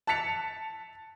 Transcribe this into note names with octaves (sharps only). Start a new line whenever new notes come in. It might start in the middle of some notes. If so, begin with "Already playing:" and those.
A5 F#6 A6 B6 C#7 F7